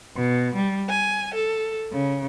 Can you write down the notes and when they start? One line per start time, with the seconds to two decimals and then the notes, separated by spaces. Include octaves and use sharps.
0.15 B2
0.55 G3
0.88 G#5
1.33 A4
1.92 C#3